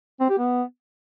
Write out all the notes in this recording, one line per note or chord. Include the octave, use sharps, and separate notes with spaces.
C4
G4
B3